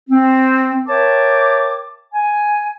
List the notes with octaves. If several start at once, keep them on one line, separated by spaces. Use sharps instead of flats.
C4
A#4 C#5 E5 G5 A5 D6
G#5